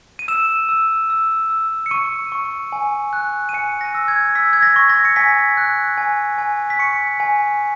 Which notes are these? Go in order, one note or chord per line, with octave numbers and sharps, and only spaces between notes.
D#7
E6 E7
E6
E6
E6
C#7
C#6 D#7
C#6
G#5
F#6
D#7
G#5 C#7
A#6
E6
G#6
E6 B6
G#6
A#6
C#6
A#6
C#7
G#5 B6
F#6
G#5
G#5
B6
C#6 C#7
G#5